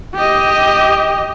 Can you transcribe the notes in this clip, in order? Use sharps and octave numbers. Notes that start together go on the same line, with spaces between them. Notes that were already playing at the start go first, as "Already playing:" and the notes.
G4 D#5